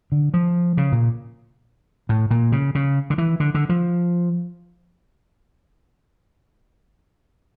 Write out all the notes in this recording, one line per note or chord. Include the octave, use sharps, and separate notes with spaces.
D3
F3
C#3
A#2
A2
A#2
C#3
C#3
D3
E3
D3
D3
F3